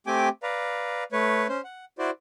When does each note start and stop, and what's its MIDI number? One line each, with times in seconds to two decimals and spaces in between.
0.07 0.29 57
0.07 0.29 60
0.07 0.29 67
0.07 0.29 79
0.07 0.29 80
0.07 0.29 86
0.43 1.04 71
0.43 1.04 74
0.43 1.04 77
0.43 1.04 82
1.12 1.47 57
1.12 1.47 71
1.12 1.47 73
1.49 1.61 61
1.49 1.61 72
1.64 1.85 78
1.98 2.11 64
1.98 2.11 66
1.98 2.11 72
1.98 2.11 74